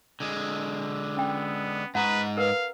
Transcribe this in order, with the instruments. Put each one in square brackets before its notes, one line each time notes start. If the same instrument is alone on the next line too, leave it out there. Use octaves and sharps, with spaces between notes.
[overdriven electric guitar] D3 G#3
[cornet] B3 [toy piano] C#4 G5
[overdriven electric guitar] G#2 D#4 [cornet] B4 [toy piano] F#5 A#5
[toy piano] A#4 B4 [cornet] F5